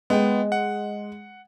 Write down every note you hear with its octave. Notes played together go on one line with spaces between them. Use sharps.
G#3 B3 G5
F#5